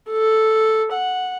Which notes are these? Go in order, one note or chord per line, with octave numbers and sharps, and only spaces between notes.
A4
F#5